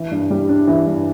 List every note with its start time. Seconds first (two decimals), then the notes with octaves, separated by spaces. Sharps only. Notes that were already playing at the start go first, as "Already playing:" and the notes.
Already playing: E3
0.11 G2
0.30 G3
0.49 D4
0.67 E3
0.87 G2